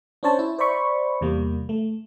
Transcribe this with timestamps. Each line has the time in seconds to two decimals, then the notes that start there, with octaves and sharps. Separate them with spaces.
0.23 C#4 D4 C5 C#5 A5
0.39 E4
0.59 C5 D5 E5 B5 C#6
1.21 E2 C3 G3 A#3
1.69 A3